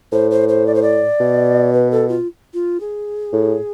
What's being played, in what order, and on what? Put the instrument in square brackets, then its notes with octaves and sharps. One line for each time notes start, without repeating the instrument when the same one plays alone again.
[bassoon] A2 [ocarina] C5
[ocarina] C5
C5
D5
C5
D5
[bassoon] B2
[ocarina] B4
A4
F4
F4
G#4
[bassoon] A2